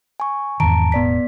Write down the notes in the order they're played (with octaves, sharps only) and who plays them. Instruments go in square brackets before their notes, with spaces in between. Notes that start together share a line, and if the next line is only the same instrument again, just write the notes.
[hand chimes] G#5 C#6
[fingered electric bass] E2 G#2 D#3 [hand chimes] A5 A#5 D7
[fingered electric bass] E1 A2 [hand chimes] B3 D5 B6